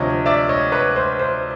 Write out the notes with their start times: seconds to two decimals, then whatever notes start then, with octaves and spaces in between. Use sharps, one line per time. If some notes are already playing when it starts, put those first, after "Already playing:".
Already playing: D2 C3 F3 C#5 D#5
0.26 D5 E5
0.49 C#5 D#5
0.72 B4 C#5
0.96 C5
1.20 C5